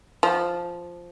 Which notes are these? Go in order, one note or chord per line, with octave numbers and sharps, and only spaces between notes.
F3